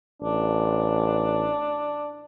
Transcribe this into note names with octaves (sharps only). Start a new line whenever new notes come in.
A1 D4